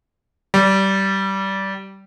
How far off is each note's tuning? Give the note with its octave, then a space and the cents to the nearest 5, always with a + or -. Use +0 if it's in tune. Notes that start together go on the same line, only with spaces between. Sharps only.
G3 -20